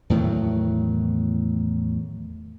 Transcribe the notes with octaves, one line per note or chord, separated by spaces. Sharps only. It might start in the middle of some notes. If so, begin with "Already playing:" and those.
E2 A2 D#3 F#3